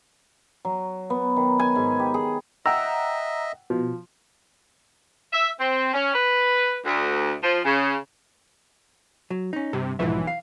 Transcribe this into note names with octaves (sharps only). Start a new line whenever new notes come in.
F#3
B3
D#3
G#5
G#2
G4
G#4
D#5 E5 F#5 G5 A#5 E6
B2 F3
E5
C4
C#4
B4
D2
F3
C#3
F#3
C#4 D#4
G2 C3
B1 G#2 E3 F3 E5
F5